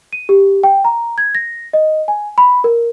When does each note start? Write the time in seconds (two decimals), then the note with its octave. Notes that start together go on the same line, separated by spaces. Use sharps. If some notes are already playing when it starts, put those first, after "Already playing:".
0.13 D#7
0.29 G4
0.63 G5
0.85 A#5
1.18 G#6
1.35 A#6
1.73 D#5
2.08 G#5
2.38 B5
2.64 A#4